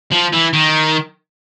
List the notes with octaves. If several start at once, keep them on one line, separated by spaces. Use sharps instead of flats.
F3
E3
D#3